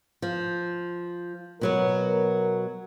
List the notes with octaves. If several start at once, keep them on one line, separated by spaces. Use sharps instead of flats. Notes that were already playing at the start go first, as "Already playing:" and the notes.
F3
B2 F#3 B3 A#4